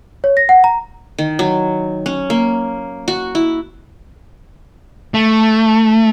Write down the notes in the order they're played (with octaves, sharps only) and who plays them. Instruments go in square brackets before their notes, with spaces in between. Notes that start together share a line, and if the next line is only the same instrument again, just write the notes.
[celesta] C#5
A#6
F#5
A#5
[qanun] D#3
F#3
C#4
A#3
F#4
E4
[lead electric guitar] A3